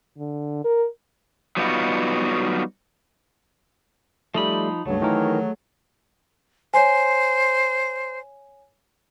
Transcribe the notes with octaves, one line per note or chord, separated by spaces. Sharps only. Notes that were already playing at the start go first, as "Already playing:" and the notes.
D3
A#4
F#3 G3 B3 D#4 F4 F#4
F3 G3 A3 D#4 B5
C#2 G2 F#3 A3 G#4
D#3 E3 A#4
C5 C#5 G#5